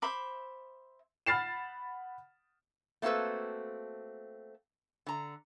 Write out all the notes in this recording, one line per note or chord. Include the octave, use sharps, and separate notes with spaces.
C5 E5 B5 D6
F#5 B5 F6 A6 C7 E7
A3 A#3 C4 F#4 A4 B4
D3 A#5